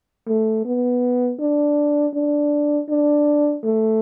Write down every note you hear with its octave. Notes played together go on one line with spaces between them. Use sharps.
A3
B3
D4
D4
D4
A3